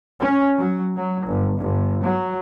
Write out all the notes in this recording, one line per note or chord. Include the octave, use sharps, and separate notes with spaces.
C#4
F#3
F#3
G1
G1
F#3